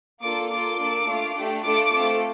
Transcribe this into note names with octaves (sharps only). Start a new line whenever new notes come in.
A#3 D4 F4 A4 D6
A#3 F4 A4 D6
A#3 D4 A4
A3 D4 F4
A3 D4 G4
A3 D4 F4 A4 D6
A3 C4 F4 A4